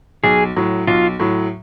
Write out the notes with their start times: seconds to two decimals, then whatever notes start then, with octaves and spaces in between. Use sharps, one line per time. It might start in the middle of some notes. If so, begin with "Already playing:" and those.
0.23 B1 G#4
0.56 A2 F#3
0.87 B1 F4
1.20 A2 F#3